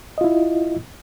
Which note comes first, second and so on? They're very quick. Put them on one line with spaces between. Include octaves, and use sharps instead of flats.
D#5 F4 E4